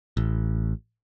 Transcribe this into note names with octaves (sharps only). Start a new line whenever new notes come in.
A1